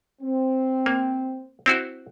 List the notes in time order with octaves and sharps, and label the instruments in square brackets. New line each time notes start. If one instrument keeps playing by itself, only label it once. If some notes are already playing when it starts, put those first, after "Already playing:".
[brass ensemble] C4
[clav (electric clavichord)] A#3
C4 E4 F#4